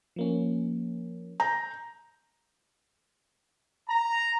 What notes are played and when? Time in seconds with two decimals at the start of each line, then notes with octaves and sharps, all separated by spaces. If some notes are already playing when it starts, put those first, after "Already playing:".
0.16 F3 A#3 C#4
1.40 A#5 G6
3.88 A#5